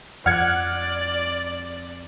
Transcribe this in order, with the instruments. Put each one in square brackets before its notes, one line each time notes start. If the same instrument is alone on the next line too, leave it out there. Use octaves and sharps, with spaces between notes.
[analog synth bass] F2 [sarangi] D5 [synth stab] F#5 [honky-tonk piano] F6 G#6